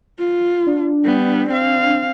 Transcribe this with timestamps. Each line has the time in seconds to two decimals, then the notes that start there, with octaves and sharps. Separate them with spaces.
0.19 F4
0.67 D4
1.04 G3 B3
1.49 C4 F5